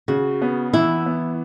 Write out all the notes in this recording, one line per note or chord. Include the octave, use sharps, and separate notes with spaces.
C#3 F#4
B3
E3 E4
B3